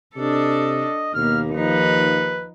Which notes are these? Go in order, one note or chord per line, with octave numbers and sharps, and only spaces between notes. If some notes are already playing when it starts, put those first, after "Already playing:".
C3 D4 A4 D#5
D#2 B2 A#3 F6
F3 D#4 B4